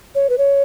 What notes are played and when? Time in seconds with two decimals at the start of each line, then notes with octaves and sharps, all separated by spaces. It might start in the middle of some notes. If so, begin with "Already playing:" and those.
0.15 C#5
0.29 B4
0.38 C#5